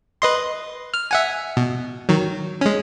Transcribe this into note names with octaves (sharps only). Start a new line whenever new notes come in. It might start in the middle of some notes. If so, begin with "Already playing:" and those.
B4 D#5 C6
F6
E5 F#5 G#5
B2
D#3 F#3
G#3 C#4